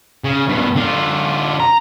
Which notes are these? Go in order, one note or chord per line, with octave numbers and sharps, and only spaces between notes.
C#3
G2 B2
D3 F4
A#5